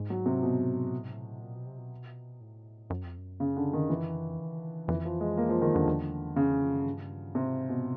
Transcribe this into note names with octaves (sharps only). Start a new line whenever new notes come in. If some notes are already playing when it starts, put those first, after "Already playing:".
Already playing: G#2
F#3
C3
B2
A2
G#2
A2
A#2
B2
C3
B2
A2
F#2
F2
F#2
C#3
D3
D#3
F2 E3
F#2
F2
F#2
F2
F2 E3
F3
G#3
A#3
F3
D#3
F2 D3
E2
F2 C#3
E2
F2
F#2
G2
G#2 C3
B2